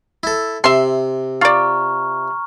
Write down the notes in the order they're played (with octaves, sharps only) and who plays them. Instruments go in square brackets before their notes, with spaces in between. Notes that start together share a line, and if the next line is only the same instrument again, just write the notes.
[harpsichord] E4 A4
[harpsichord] C3 [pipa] E5 C6
[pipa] F4 D5 [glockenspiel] A#5 C#6 F6